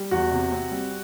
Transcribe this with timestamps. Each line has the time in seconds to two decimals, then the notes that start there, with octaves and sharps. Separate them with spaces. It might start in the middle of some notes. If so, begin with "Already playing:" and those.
Already playing: G3
0.11 E2 F#4
0.32 C3
0.52 C4
0.71 G3